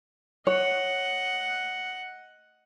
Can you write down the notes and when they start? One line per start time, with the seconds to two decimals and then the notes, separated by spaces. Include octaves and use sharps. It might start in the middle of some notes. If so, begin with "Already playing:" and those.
0.47 C#5 D#5 F#5